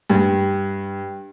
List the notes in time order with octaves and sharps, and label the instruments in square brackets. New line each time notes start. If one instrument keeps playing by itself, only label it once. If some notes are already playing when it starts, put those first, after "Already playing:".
[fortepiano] G2